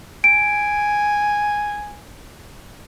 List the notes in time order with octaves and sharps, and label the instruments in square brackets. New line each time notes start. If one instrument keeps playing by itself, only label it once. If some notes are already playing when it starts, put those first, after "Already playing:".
[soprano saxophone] G#5 [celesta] D7